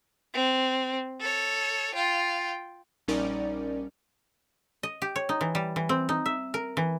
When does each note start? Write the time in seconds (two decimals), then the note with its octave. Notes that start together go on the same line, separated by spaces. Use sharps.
0.34 C4
1.20 A4 C#5
1.95 F4 G5
3.08 A#1 G3 C#4 D#4 A#4 D5
4.83 D#5
5.02 G4
5.16 C#5
5.29 D#4
5.41 E3
5.55 G3
5.76 E3
5.89 C4
6.09 D#4
6.26 E5
6.54 A#4
6.77 E3